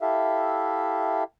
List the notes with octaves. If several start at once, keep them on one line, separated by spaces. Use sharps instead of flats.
E4 G4 A4 E5 F5